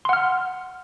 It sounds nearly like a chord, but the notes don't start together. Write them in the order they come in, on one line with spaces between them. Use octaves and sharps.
C6 F#5 F6